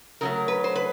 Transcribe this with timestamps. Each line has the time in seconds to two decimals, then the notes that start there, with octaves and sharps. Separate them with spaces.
0.21 C#3 F#3 A3 A#4
0.48 B4
0.64 C5
0.76 B4